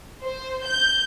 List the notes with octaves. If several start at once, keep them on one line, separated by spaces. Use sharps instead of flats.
C5
G6